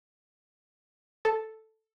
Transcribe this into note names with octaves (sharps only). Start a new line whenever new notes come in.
A4